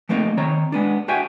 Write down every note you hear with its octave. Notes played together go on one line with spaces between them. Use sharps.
F3 A3 A#3 C4 D#4
D#3 C4 C#5 A#5
G#3 B3 D4
D4 F#4 C5 E5 G5 G#5